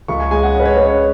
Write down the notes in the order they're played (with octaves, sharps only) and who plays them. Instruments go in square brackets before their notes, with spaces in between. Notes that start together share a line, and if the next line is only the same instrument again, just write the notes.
[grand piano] C#2 C#6
G#5
G#3 G#5
F#5
C#4 D#5
B4
C#5
G#3 B4
C#5